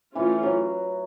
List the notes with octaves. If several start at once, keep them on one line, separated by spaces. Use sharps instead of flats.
E3 A3 C#4 F4
F#3